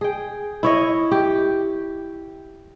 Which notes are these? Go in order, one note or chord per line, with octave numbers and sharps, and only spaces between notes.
G#4 G5
E4 C#5 D#5
G4